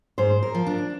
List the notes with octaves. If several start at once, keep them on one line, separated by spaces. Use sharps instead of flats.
G#2 C5
A#4
F3
D4